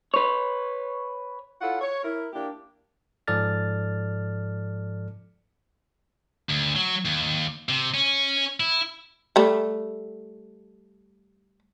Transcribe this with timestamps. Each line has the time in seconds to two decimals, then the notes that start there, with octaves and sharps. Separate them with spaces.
0.14 B4 C#5
1.61 E4 F4 A4 C#5 F#5
1.81 C#5
2.03 E4 A#4
2.33 A#3 D4 E4 G4
3.27 G#2 F3 A4 D5 F6 A6
6.49 D2
6.76 F#3
7.05 D#2
7.69 C3
7.94 C#4
8.60 E4
9.36 G3 A3